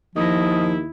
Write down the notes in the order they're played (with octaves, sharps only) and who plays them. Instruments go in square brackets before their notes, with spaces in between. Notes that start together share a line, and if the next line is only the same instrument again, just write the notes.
[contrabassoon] D#2 [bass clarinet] F3 [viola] E4 [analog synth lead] D#5